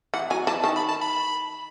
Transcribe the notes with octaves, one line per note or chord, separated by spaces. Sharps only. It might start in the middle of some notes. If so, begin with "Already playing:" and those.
E3 F#5
F#3 G#5
E3 A5
D#3 A5
B5
A5
B5